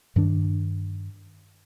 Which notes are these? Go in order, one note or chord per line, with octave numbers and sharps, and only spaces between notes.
G2 D#3 D4